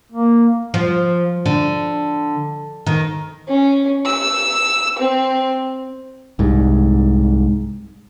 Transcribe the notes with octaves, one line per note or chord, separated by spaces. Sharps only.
A#3
F3
D3
D#3
C#4
E6
C4
C2 G#2